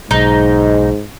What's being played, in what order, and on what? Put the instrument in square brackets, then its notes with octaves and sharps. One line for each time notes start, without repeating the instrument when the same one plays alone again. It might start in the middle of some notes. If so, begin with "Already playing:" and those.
[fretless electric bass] B1 [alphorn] G#2 [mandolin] D#4